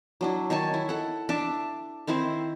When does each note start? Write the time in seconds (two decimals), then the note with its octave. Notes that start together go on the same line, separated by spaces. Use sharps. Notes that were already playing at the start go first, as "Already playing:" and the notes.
0.21 F#3 D4 E4
0.50 D#3 C#5 G#5 A5
0.74 E4
0.89 A4 F#5
1.29 D4 E5 A5 D6
2.07 D#3 C4 E4 C5